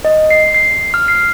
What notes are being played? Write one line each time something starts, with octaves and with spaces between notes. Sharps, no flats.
D#5
C7
C7
F6
C7